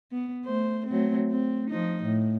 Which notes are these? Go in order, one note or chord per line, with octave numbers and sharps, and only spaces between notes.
B3
A3 C5
F#3 A3 C4
C4
F3 D#4
A2